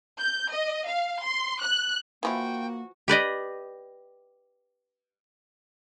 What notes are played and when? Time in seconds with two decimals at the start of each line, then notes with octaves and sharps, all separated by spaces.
0.19 G6
0.50 D#5
0.87 F5
1.23 C6
1.61 F#6
2.23 E3 F3 A#3 E4 F#4 G5
3.08 G4 B4 D5 D#5